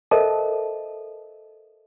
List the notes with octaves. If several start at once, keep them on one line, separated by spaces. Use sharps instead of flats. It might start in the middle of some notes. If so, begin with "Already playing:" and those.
A4 A#4 C5 D#5 E5 A5